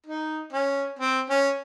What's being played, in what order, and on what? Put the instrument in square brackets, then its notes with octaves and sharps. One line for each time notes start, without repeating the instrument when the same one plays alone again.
[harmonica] D#4
C#4
C4
C#4